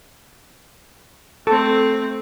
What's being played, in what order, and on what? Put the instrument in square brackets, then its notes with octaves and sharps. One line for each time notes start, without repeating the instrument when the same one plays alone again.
[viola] A3 C4 [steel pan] A4